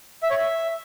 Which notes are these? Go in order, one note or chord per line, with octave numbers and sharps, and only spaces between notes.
E5
C#5
E5